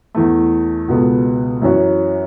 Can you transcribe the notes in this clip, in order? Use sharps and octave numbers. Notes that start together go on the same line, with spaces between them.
E2 E3 A3
C#2 B2 B3 A4
F#2 E3 C#4 F#4